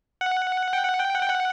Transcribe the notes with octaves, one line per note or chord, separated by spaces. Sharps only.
F#5
G5
F#5
G5
F#5
G5
F#5